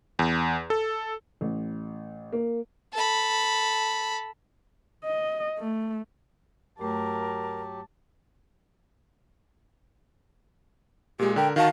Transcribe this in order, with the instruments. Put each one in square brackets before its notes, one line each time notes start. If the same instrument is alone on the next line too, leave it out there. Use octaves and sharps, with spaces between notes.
[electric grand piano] E2
A4
[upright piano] A1
A#3
[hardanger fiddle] A4 B5
[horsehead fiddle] D#5
A3
[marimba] G2 A3 [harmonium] F#3 G4 [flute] A#4 [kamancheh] A5
[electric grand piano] A#2 G#3 [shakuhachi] G4
[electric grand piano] D3 A#4 [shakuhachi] G5
[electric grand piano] D#3 F#4 A5 [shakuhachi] F5